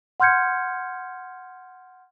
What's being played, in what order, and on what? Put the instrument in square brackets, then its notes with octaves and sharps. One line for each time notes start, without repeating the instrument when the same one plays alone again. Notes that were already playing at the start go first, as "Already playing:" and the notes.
[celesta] F#5 C6 F6 G6 G#6 C#7